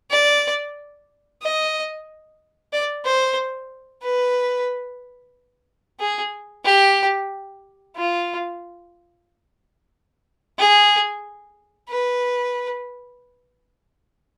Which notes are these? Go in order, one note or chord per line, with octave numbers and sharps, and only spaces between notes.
D5
D#5
D5
C5
B4
G#4
G4
F4
G#4
B4